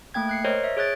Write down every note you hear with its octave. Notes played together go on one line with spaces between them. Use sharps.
A3 A#3 G5 G#6
F#6 C7 C#7
A#4 C5 C#5 D#5
E5
G#4 C#5 F#6 A6 D7